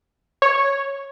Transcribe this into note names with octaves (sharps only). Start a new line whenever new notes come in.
C#5